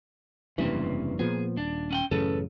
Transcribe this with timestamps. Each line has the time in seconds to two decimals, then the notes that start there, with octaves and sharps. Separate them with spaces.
0.58 F1 G2 C#3 E3 A#3 C4
1.19 A#2 F3 B3 G#4
1.57 D#1 D4
1.91 C#4 F#5 G5
2.11 A1 F#2 C#3 A4 B4